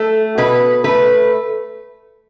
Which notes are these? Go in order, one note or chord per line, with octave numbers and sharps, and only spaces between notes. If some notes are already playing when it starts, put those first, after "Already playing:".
Already playing: A3
B2 B4
A3 B4